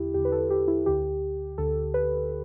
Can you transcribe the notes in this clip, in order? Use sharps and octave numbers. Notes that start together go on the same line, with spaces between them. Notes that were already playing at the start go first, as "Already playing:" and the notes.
Already playing: E2 D3 E4 G4
E2 D3 G4
B4
A4
G4
E4
D2 D3 G4
D2 D3 A4
B4